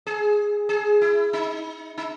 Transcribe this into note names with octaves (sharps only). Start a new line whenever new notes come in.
G#4
G#4
E4
D#4
D#4